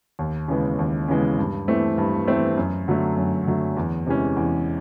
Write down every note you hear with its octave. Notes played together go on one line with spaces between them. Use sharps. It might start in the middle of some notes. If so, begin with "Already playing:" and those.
D#2
C#3 E3 G#3 B3
D#2
C#3 E3 G#3 B3
G2
E3 A3 C4
G2
E3 A3 C4
F#2
D3 F#3 A3
F#2
D3 F#3 A3
E2
C3 E3 G#3 C#4
E2